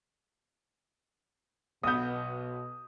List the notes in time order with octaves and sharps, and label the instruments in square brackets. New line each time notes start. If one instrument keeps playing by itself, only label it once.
[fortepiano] B1 B3 [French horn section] B2 [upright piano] D#6 G6